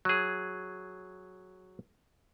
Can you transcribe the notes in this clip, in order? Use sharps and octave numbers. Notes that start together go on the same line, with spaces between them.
F#3 G#4